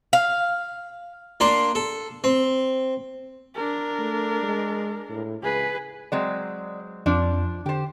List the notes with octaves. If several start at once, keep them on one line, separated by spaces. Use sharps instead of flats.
F5
A#3 D4 C6
A4
C4
D4 A#4
A3
G#3
A2
C#2 G#4 B4
F#3 G#3 C4 D5
F2 F3 D4
D3 G4 C5